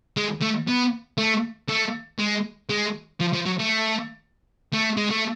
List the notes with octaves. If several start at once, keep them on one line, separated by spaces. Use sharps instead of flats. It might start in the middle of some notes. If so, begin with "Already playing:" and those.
G#3
A3
B3
A3
A3
G#3
G#3
F3
F3
F#3
A3
A3
G#3
A3